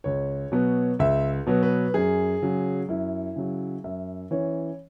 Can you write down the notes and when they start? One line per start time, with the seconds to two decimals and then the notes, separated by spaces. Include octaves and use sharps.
0.04 C#2 C#5
0.52 B2 F#3 B3
0.99 C#2 E5
1.46 B2 F#3 B3
1.63 B4
1.94 F#2 G#4
2.42 C#3 F#3
2.89 F#2 E4
3.36 C#3 F#3
3.84 F#2 E5
4.31 E3 C#4 C#5